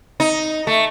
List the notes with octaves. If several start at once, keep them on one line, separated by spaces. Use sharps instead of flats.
D#4
A3